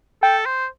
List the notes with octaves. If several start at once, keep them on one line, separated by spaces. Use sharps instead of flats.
A4 G5
C5